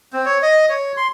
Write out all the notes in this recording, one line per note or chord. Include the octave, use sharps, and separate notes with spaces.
C4
C#5
D#5
C#5
C6